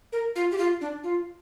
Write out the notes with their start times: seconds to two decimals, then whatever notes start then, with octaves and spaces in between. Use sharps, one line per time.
0.13 A#4
0.36 F4
0.52 G4
0.58 F4
0.81 D4
1.04 F4